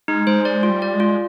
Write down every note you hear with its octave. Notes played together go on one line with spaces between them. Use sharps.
G#3 D#4
G#3 C5
G#3 D5
F4
G3
D5
G#3
F4